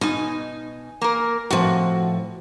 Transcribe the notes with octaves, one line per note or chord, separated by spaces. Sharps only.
B2 D#4 G#5
A#3 A#4
A2 C3 F3 F#4